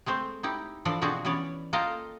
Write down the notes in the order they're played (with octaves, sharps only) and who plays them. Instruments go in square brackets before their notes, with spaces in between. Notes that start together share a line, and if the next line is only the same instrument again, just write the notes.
[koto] G#3 A3 C4 C5
D#4 E4 G4
E3 F3 D4 A4 D5
B2 F3 C4 D4 F#4 G#4
E3 B3 C#4 C#5 D5
A#3 F4 A4 D#5 F5 G5